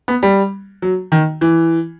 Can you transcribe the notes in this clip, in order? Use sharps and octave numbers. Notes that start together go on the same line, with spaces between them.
B3
G3
F#3
D#3
E3